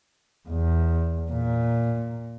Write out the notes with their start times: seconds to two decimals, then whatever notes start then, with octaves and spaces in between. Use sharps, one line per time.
0.49 E2
1.31 A#2